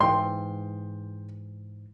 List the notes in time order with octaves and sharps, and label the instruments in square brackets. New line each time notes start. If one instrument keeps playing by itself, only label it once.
[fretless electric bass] G#2 E3 [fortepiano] G5 C6